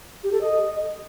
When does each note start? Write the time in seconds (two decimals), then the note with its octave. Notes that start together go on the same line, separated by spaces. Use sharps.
0.24 G4
0.32 A4
0.41 D#5